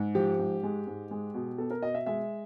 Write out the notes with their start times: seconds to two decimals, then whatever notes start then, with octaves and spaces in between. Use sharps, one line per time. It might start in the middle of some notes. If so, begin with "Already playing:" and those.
Already playing: G#2
0.15 F3 G4
0.39 G#2
0.63 G#3
0.87 G#2
1.11 G#3
1.34 B2
1.58 B3 A4
1.71 A#4
1.82 B2 D#5
1.95 E5
2.06 G#3 E5